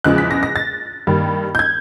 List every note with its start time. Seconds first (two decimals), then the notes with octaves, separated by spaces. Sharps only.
0.04 E2 C#3 F3 G#3 F#6
0.18 B6
0.31 A#6
0.43 A#6
0.56 A6
1.07 G2 D#3 G3 A#3
1.55 G6
1.59 G#6